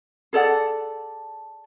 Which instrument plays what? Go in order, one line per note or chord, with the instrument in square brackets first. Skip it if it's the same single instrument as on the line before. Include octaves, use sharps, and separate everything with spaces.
[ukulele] G#4 A4 D5 F#5